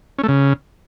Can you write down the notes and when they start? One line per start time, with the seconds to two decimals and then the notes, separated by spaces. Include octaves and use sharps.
0.18 C#4
0.24 A3
0.29 C#3